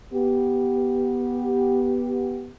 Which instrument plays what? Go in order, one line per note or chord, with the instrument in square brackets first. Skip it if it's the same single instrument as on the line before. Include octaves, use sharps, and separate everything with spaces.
[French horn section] B3 G4